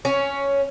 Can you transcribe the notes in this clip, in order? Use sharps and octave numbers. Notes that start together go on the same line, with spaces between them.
C#4